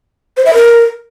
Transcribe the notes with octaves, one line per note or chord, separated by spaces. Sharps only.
C5
E5
A#4